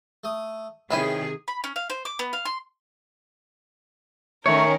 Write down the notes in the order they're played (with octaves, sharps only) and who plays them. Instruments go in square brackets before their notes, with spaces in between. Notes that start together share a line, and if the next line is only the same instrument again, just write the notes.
[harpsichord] A3 D#6
[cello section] C3 D#3 G#4 [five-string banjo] C#4 E4 G#5 [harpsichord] B4 G5
[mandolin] B5
C#4
F5
C5
D6
B3
F5
C6
[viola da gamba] D#3 [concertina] A3 [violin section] C#4 A#4 [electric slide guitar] C#5